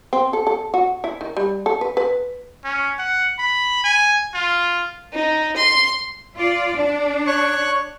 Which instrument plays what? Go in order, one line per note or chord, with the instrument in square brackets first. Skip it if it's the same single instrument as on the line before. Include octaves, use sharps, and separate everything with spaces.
[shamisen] C4
A4
A4
F#4
E4
D#3
G3
A4
B4
B4
[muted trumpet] C#4
F#5
B5
G#5
F4
[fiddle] D#4
C6
[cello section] F4 D5
D4
[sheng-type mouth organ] C#5 C#6 F#6